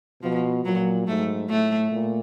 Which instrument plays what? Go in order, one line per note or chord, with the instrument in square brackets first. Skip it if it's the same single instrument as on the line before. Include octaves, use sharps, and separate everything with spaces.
[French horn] B2 [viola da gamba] F3
[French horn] A#2 [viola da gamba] F#3
[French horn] G#2 [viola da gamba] A3
[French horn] A2 [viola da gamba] A3
[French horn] A#2